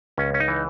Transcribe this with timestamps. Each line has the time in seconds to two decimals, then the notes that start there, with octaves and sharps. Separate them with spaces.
0.18 C#2 C#4
0.34 C#4
0.40 D#4
0.48 E3